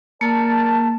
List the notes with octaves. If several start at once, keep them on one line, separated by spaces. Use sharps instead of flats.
A#3 A#4 D5 A5